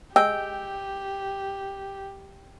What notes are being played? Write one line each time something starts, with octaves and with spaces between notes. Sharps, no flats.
G#3 G4 G5 E6